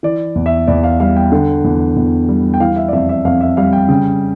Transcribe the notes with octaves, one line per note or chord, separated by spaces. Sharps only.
E3 D5
E2
E5
E2 D5
F5
G3 F5
G5
D3
E2
E2
G3
G5
E3 F5
E5
D5
F2 E5
E5
F2 F5
E5
G3 F5
G5
C#3 G5